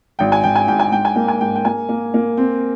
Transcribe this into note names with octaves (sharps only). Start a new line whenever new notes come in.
G#1 G5
G#5
G#1 G5
G#5
G#2 G5
G#5
G#2 G5
G#5
A#3 G5
G#5
G#2 G5
G5
A#3 G#5
A#3
A#3
C4